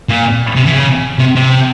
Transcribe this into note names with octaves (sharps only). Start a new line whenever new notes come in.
A#2
C3
E3
C#3
C3
C3